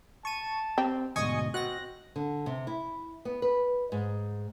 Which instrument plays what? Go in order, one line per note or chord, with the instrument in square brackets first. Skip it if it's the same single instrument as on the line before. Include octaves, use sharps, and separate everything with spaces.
[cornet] A5 [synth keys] C#6 D#7
[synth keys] C4 [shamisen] G4
[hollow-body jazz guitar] D2 G#2 B2 [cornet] D#5 [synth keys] G#5 C#6 D#6
[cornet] C4 [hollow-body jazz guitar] F#4 D#5 F#5 [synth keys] F#6 A#6
[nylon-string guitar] D3
C3
E4
B3
B4
G#2